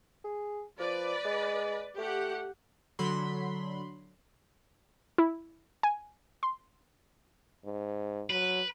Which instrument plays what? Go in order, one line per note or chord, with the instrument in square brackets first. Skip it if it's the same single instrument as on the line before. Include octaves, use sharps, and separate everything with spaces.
[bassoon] G#4
[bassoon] F3 [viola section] B4 D5
[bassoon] G#3
[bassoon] A3 [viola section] G4 F#5
[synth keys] D3 F#3 B5 C6
[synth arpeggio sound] E4
G#5
C6
[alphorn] G#2
[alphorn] F#3 [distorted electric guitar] B4